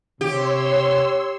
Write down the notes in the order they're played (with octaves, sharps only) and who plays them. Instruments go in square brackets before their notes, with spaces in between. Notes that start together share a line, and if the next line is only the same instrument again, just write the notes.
[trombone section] C3 [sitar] G4 [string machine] C#5 C6 E6